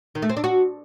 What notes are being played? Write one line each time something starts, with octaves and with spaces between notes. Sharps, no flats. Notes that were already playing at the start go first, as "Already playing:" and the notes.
D#3
A3
C4
D4
F#4